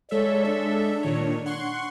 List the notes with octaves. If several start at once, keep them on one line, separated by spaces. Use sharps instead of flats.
G#3 A4 C#5 D5 E5
D4
A#2 D#3 C#5
F#5 C6 C#6